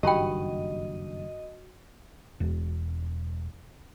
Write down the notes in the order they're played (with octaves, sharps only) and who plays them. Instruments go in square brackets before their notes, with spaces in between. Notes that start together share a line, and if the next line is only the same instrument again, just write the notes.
[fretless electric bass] F#1 G2 D#3 [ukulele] F#4 B5 [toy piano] G4 G5 [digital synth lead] D#5
[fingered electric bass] E1